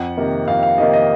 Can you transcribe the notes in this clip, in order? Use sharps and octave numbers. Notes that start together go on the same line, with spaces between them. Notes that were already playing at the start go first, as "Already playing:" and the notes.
Already playing: F2 F#5
C3 D#3 A#3
F2 F5
F5
C3 D#3 A#3 D#5
D#5